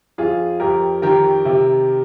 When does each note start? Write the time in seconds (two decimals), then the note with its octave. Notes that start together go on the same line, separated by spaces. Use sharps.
0.18 F2 F4 G#4
0.60 F2 G4 A#4
1.02 D#3 G4 A#4
1.45 C3